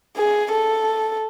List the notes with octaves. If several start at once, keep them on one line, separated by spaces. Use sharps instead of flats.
G#4
A4